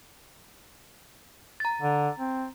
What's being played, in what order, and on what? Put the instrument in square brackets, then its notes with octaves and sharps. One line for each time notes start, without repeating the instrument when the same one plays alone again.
[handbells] A#5 A6
[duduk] D3
C4